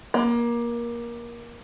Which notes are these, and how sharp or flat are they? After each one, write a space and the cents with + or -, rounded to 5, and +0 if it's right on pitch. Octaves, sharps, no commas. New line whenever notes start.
A#3 +20